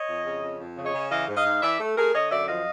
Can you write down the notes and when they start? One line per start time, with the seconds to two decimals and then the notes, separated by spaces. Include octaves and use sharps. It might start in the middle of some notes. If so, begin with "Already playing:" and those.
Already playing: C#5 D#5
0.08 F2
0.25 C#3
0.43 F2
0.59 F2
0.77 C#3
0.85 C#5 D#5
0.94 C#3
1.11 E3 D#5 F5
1.28 G#2
1.37 D#5 F5
1.45 G#2
1.54 D#5
1.62 E3 D5 E5
1.80 A3
1.97 A3 G#4 A#4
2.14 D3 C#5 D#5
2.31 F#2 D5 E5
2.48 F3 D#5 F5